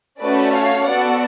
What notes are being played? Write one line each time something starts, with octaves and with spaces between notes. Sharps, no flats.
A3 C#4 F#4 A4 B4 D5
C#5 F5
B3 F#4 A4 D5 F#5